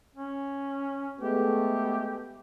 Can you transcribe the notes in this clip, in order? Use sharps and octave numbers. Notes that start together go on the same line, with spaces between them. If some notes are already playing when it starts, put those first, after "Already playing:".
C#4
G#3 A3 B3 G4